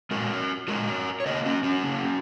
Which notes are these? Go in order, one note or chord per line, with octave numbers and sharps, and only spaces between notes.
A#2 G#3 F#4 A#4
A#2 G#3 F#4 A#4
C#5
C#3 A#3 A#4 D#5
C#4 F#4
C#4 F#4
C#3 A#3